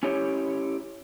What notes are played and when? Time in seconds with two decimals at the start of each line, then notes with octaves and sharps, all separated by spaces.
0.03 C#4 E4 G4 C#5